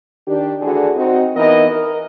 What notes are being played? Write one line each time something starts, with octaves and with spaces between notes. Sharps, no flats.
D#3 D4 G4
D2 D3 E3 D4 F#4 G#4
C4 D#4 F#4
E3 B3 D#4 A#4 D#5
A#4